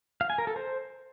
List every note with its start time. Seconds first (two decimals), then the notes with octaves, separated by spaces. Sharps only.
0.21 F5
0.30 G#5
0.38 A#4
0.47 A4
0.56 C5